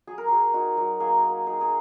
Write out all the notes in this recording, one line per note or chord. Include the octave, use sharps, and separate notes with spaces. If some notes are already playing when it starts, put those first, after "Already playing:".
F#3 G#4
A#4
F#3 G#4
D#4 F#4
F#3
A#3 G#4
A#3
D#4 G#4
G#4